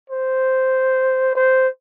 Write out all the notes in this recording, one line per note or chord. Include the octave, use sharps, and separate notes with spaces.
C5
C5